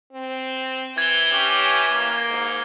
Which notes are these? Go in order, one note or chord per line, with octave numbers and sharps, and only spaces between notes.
C4
E3 G#6 G7
C#4 G4
A#3
G#2